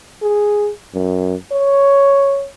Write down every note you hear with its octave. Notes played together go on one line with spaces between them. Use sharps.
G#4
F#2
C#5